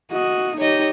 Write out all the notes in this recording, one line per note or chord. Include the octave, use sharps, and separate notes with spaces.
F#4 D#5
D#4 G4 C#5 D#5